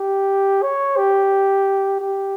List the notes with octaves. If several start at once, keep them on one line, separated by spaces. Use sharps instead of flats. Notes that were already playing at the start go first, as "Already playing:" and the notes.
Already playing: G4
C#5
G4
G4